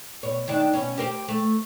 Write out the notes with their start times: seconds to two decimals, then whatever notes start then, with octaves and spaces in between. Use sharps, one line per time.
0.23 B2 C#5
0.48 D#3 D4
0.73 B2 C#4
0.98 G4 A#4 C5
1.28 A3